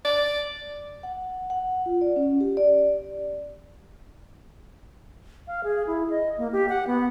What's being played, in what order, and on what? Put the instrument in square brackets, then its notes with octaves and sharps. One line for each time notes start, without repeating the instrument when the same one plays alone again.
[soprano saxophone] D5
[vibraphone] F#5
F#5
F4
D5
C#4
G4
D5
[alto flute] F5
G#4
E4
D#5
A#3
G4
F#5
B3